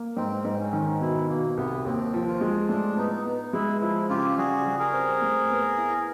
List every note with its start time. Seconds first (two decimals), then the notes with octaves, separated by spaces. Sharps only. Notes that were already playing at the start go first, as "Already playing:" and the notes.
Already playing: A#3
0.17 G#2 C4
0.45 G#2
0.60 C#4
0.73 D#3
1.01 B2 E4
1.29 B2 A#3
1.57 C2 B3
1.85 D#2 C4
2.14 F3
2.27 F4
2.41 G#3
2.69 A2 D4
2.97 B3 D#4
3.25 B3 D#4
3.53 G#3 E4
3.81 F3 E4
4.09 C#3 F4 G4
4.37 G3 F#4 G#4
4.66 G3
4.80 G#4 A#4
4.93 C4
5.22 A2
5.50 B3
5.78 E4